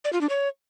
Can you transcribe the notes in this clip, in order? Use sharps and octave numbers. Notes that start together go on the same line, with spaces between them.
D5
F4
D4
C#5